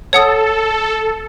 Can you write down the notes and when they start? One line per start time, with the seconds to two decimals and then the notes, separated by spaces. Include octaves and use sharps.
0.13 A4 C#5 F#5 D#6